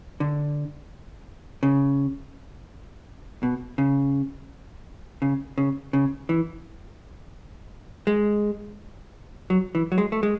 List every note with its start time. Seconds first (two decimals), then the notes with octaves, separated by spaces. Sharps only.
0.20 D3
1.63 C#3
3.43 B2
3.78 C#3
5.22 C#3
5.58 C#3
5.93 C#3
6.29 E3
8.07 G#3
9.50 F#3
9.75 E3
9.92 F#3
9.98 G#3
10.12 A3
10.23 G#3